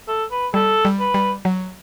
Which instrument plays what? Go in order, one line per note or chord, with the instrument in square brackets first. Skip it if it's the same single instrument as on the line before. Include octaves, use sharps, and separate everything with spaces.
[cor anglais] A4
B4
[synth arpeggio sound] G3 [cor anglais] A4
[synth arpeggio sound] G3
[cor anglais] B4
[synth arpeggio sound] G3
F#3